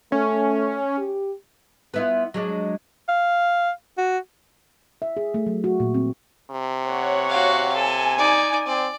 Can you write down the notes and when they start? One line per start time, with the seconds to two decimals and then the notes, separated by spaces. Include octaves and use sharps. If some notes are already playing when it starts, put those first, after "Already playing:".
0.12 A3 C#4
0.98 G4
1.94 B3 E4 F4
2.34 F#3 G#3 D4
3.09 F5
3.98 F#4
5.02 E5
5.17 G#4
5.34 A3
5.46 F#3
5.64 F#4
5.80 A#2
5.94 C4
6.50 C3
6.84 C#5 F#5
7.29 F#4 F5
7.76 A4 G#5
8.18 D#4 D5
8.67 C4 D5